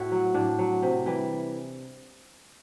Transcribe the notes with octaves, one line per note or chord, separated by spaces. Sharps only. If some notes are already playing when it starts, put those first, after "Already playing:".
Already playing: A2 E4 F#4
F#3
A2 D4
F#3
C3
E3 G3